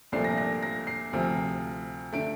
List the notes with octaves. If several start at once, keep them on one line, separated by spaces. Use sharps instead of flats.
C2 A#2 F3 A3 D4 C7
A#6
A#6
A#6
C7
D2 C3 F3
D3 A3 D7